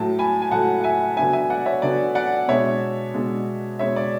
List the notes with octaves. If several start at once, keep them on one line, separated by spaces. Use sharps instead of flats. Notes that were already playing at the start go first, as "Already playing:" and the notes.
Already playing: A2 F#3 A3 A5
G#5 B5
G#5
A2 F#3 A3 F#5 A5
F#5
E5 G#5
D3 F#3 B3 D4 E5 G#5
E5 G#5
D5 F#5
C#5 E5
D3 F#3 B3 D4 D5
D5 F#5
B2 G#3 D4 C#5 E5
B2 G#3 D4
B2 G#3 D4 C#5 E5
D5